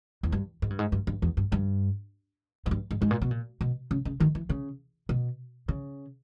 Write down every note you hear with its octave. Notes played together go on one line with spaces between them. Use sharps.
E2
G2
G#2
G2
G#2
G2
G2
E2
G2
G2
G#2
G2
G#2
G#2
A#2
B2
A#2
B2
C#3
C#3
D#3
E3
C#3
B2
C#3